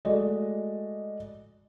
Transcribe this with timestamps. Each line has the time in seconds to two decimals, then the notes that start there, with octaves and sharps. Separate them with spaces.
0.05 G#3 A3 F#4 D5 D#5